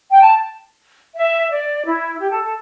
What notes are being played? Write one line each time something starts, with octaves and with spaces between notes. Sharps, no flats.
G5
A5
E5
D5
E4
G4
A4
A4